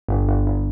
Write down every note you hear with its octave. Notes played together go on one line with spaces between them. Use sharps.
G1
G1
G1